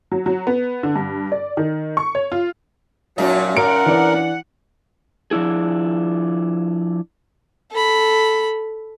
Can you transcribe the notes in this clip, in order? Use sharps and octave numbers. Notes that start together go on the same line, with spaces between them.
F#3
F#3
B3
D3
G2
D5
D#3
C#6
C#5
F4
F#2 A#2 F#3 D#4
A#4 F#5 D7
E3 D4
F3 D4 E4 G#4
A4 B5